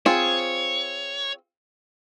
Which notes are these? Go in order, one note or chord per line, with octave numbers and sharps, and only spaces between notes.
C4 F4 G#4 C#5